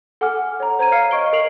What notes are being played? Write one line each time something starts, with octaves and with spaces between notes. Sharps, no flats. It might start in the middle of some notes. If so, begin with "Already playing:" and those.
A4 F#5 G#5 D6 F6
C#5 A#5
C5 A#5 G#6 D#7
F5 F6 C7 C#7
D#5 C#6 D7 G7
A#4 C7 D7 F7 F#7